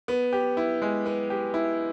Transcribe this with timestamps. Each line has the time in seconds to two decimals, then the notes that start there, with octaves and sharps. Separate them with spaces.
0.08 B3
0.33 G4
0.57 E4
0.82 G#3
1.06 B3
1.30 G4
1.54 E4